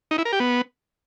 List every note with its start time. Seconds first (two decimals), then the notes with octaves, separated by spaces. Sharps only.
0.11 D#4
0.18 E4
0.25 A#4
0.32 G4
0.40 B3